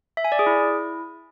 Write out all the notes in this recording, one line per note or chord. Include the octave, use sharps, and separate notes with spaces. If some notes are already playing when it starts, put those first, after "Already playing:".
E5
G#5
D5
G#4
E4